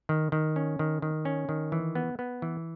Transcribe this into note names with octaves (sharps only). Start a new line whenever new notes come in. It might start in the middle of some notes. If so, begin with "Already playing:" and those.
D#3
D#3
C#4
D#3
D#3
C#4
D#3
E3
B3
B3
E3